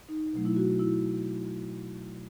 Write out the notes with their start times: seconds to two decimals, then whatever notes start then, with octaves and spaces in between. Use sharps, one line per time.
0.09 D#4
0.33 B2 F#3 A3
0.45 E4
0.57 F#4
0.79 E4